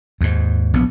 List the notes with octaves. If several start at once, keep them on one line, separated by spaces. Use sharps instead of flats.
D#2 G#2
A#1 B3